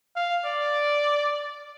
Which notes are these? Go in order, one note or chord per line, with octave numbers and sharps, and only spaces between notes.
F5
D5